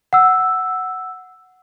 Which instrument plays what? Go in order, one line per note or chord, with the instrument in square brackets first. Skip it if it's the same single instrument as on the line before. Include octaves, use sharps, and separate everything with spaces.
[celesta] F#5 E6